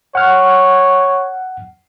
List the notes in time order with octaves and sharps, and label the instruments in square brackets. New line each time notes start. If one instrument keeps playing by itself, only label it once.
[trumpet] C#5 [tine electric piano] F#5 F6